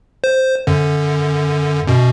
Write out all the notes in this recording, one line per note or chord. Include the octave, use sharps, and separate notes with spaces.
C5
F#2 D3
F#2 B2